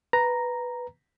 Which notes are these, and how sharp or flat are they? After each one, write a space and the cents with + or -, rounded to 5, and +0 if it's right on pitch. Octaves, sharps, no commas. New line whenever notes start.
B4 +0 A#5 +0